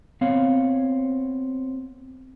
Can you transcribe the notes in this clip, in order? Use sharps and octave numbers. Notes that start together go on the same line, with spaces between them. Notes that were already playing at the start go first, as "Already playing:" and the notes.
B3 C4 C#5 F5